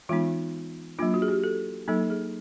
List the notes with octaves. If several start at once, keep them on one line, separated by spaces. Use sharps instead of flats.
E3 G#3 B3 D#4 F4
F#3 A#3 D4 F4
F#4
G#4
G4
A4
F#3 A#3 D#4 A4
G#4